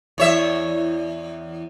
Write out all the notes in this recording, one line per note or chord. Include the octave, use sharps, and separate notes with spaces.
E2 C#5 E5